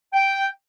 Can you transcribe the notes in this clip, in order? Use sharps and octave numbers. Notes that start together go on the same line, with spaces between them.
G5